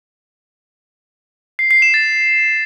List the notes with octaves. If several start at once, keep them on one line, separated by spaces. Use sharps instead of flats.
C7
C7
E7
A6